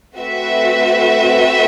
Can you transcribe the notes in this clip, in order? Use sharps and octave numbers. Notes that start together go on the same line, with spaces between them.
A3 C4 F#4 B4 E5